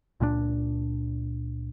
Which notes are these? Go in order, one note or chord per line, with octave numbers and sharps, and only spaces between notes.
C#2 A#2 G#3 D4